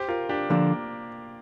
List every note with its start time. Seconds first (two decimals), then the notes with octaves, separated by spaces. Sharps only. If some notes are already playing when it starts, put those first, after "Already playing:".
Already playing: G4 C5
0.08 F4 A#4
0.29 D4 G4
0.50 D3 F3 A#3 D4